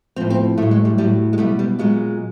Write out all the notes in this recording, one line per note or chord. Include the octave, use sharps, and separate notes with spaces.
A2 F3 C4
C4
A2 F#3 A3
G#3
G3
A2 F#3 G3
G#3
B2 G3 A3
G3
A#2 F#3 G#3